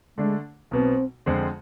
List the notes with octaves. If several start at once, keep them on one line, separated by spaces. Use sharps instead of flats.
D3 G#3 A3 D4
B1 B2 B3 C4
F2 D3 G#3 C4